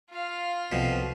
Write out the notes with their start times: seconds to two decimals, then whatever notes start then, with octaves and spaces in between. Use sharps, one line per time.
0.10 F4 F5
0.72 C2 F2 B2